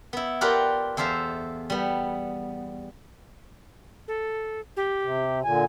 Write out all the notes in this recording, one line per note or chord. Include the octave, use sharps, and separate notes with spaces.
B3 E4
F4 G4 A#4 B4 D5 F#5
E2 A4 C5 E5 F5
G3 B3
A4
G4
C3
A#2 D3 G#5